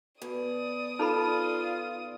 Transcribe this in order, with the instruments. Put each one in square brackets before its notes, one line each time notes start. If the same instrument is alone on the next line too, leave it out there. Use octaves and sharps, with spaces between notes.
[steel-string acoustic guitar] B2 [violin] D5 D#6
[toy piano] D#4 A4 B5 [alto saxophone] F4